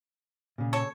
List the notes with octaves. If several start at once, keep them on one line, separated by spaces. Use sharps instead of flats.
A#2 C#3
A4 C#5